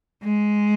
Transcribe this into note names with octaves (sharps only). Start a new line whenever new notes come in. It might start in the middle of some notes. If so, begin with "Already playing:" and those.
G#3